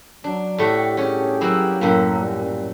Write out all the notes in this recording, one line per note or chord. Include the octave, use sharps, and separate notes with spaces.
F#3 D4
A2 A3 F#4 G4
G2 C#4 G4 G#4 C#5
F#3 A#3 E4
F#2 A2 A#3
A#2 G3